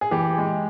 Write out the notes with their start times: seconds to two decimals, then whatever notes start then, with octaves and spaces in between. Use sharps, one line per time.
0.01 G#4
0.11 E3 G4
0.38 G#3